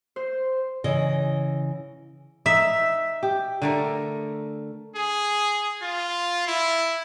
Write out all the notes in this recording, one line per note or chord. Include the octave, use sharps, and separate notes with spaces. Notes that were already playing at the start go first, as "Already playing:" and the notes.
C5
C#3 E3 D#5
D#4 E5
G4
D3 A3 A#4
G#4
F4
E4